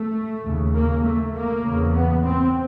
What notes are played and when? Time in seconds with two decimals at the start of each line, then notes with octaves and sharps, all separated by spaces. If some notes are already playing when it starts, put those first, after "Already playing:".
Already playing: A3
0.45 D#2 C#3
0.74 A#3
1.04 A3
1.33 A#3
1.64 E2 C#3
1.94 B3
2.24 C4